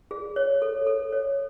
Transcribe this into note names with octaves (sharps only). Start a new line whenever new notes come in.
G#4
C#5
A4
A4
C#5